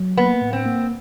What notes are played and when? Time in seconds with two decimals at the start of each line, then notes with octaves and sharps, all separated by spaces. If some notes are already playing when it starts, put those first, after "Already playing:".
Already playing: F#3
0.17 A#3 B3
0.41 A2
0.53 C4
0.66 A#3